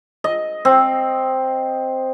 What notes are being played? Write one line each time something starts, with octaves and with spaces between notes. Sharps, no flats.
D#5
C4